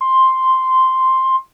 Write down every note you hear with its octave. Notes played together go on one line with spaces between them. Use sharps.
C6